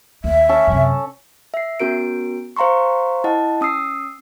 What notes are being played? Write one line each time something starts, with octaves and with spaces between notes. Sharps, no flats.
D#2 E5
C#4 A4
F#2 C3
E5 C7
B3 C#4 F#4 A#4 D7
C5 F5 A#5 C6 C#6
E4 D#5 F#5 A5
C#4 D#6 E6 C7